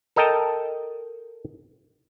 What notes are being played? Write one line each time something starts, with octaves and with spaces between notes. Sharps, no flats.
A4 A#4 D#5 G5 A5 A#5